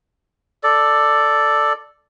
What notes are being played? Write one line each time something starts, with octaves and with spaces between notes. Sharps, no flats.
A4 D5